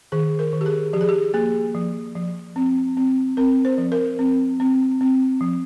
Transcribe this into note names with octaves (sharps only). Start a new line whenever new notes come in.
D#3 G#4
A#4
D#3
G4
G#4
F3 G4
G#4
G4
A#3 G#4
F3
F3
C4
C4
C4 A#4
C5
F3
A#4
C4
C4
C4
F3